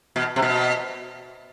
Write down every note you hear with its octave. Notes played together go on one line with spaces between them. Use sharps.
B2
C3
B2